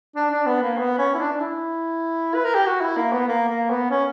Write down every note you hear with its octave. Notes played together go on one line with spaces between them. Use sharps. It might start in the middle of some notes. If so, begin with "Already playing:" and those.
D4
D4
B3
A#3
B3
C#4
E4
D4
D4
E4
B4
A#4
G4
F#4
E4
A#3
B3
A#3
A#3
B3
C#4